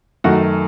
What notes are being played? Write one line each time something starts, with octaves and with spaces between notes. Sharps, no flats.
F#2 D#3 A3 F#4